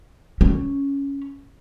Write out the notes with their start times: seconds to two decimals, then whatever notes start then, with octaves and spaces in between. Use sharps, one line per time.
0.41 C#4